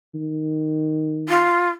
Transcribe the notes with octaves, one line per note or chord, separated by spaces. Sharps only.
D#3
F4